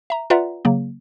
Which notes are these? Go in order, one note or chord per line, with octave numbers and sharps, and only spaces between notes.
E5 A#5
F4 B4 D5 E5 F#5 A#5
C#3 F#3 A#3